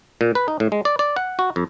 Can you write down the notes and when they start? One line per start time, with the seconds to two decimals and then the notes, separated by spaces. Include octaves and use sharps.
0.21 A#2
0.35 B4
0.48 D#4
0.60 A2
0.72 G#3
0.85 D5
0.99 D5
1.16 F#5
1.39 F#4
1.56 F2